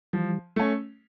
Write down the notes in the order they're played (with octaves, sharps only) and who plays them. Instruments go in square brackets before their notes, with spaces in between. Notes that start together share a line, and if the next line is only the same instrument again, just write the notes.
[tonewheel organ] E3 G3 [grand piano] F3
[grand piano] A3 C#4